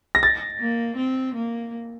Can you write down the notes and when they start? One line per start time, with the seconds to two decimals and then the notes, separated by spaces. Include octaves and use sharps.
0.15 A#6
0.23 A6
0.60 A#3
0.97 C4
1.35 A#3